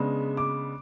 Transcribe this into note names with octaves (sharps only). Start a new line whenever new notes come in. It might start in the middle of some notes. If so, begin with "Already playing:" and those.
Already playing: C#3 G#3 B3 D4
D6